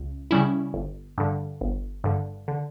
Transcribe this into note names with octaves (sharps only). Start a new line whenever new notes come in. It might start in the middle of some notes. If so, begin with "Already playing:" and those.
Already playing: C#2
C#3 G3 C#4 E4
G1
G2 D3
G1
G2 D3
D3